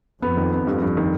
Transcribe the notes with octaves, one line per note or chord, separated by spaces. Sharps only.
F2 B3
D#3
B3
G2
G2
D#3